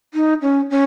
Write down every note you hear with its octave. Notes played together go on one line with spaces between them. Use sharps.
D#4
C#4
C#4